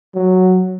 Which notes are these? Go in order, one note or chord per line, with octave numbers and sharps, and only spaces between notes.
F#3